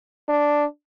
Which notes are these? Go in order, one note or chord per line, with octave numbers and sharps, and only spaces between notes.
D4